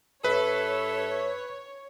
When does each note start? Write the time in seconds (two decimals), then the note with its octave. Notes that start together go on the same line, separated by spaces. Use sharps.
0.24 G2 A4 B4 C#5 E5